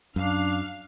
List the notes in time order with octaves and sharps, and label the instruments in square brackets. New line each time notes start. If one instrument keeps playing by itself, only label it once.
[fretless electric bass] F#2 [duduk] D4 [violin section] F5